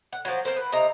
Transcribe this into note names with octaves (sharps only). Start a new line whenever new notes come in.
F#5
F3 F#3
C4 A#4 C5
B4
C3 D#5 A#5